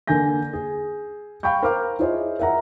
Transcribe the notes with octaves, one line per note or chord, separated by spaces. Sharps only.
D3 A#3 G#5 G6 A#6
G#4
F5 G5 B5 C#6 G6
A#4 C5 F5 A#5 D6 F6
E4 F4 G#4 C5 C#5 D#5
A#4 E5 F#5 A#5